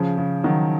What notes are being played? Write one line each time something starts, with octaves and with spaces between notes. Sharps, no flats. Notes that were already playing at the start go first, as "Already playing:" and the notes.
Already playing: C#3 F3
C#3
D#3 F#3